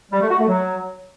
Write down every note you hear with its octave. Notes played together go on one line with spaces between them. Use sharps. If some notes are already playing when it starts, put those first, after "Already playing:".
G3
A3
F#4
A3
F#3